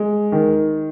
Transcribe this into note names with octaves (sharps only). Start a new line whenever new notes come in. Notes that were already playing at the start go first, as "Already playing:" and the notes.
Already playing: G#3
D#3